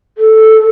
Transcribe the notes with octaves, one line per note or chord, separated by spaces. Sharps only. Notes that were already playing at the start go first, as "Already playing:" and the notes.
A4